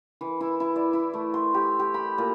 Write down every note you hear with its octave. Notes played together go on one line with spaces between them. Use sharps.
E3
E4
E4
D5
E4
A3
C6
G4
G4
B5
A#2